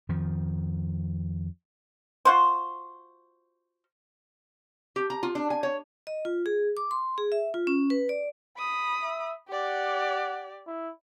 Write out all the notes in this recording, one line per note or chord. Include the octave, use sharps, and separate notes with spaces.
F2 D#3 F3
F4 F#4 C5
G4
A#5
F4
D4
G#5
C#5
D#5
F4
G#4
D6
C6
G#4
E5
F4
C#4
B4
D5
B5 D#6
E5
G4 D5 F#5
E4